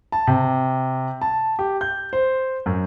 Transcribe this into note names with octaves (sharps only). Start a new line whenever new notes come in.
A5
C3
A5
G4
G6
C5
F#2